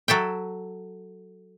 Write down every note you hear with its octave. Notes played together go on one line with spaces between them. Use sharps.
F#3 A4 E5 G5